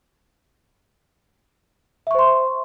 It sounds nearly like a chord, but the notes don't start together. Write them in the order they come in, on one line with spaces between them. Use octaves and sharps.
E5 C#6 C5 C6